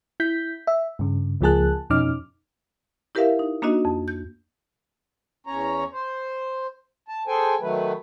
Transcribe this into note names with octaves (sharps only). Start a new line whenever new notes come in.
E4 G6 B6
E5
G2 C#3
C#2 F3 A#3 G#4 A5 F#6
F2 B2 C#4 D#4 D6 F6
E4 G4 A#4 B4 E5 F5
D#4
A#3 D4 D#4 F#4 D#5
F2
G6
E2 C#4 C#5 A#5
C5
A5
G#4 A4 C5 G5 G#5
D#3 F#3 A3 B4